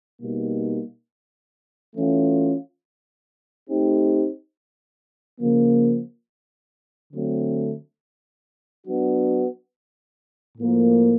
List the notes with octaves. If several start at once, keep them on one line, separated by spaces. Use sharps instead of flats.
B2 G3 A#3 D#4
E3 A3 C#4 F4
A3 C4 D#4 G4
C#3 F3 A#3
D3 F#3 A3 C4
F#3 B3 D4 F#4
A2 F3 A#3